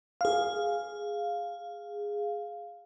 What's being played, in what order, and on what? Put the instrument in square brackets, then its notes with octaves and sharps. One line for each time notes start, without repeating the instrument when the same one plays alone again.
[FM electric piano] G#4 F5